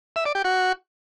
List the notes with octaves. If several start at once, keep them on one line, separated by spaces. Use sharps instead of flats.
E5
D5
G4
F#4